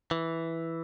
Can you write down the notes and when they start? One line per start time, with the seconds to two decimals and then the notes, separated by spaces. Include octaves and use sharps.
0.11 E3